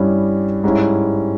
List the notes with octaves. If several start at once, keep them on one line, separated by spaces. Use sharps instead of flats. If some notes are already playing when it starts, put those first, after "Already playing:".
Already playing: G2 G3 C#4 E4
G#2 G3 C#4 E4